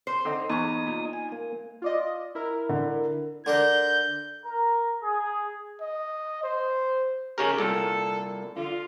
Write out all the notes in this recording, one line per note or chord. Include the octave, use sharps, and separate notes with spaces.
C5
D3 C4 D#4
E2 D#4 C#6 D#6
A#2
G#5
A#3
F4 D5 D#5
E4 A#4
D3
D3 D4 A#4 G6
A#4
G#4
D#5
C5
C#3 A3 C#4 D#4 G4 A#4
C2 A#2 A4
D3 F4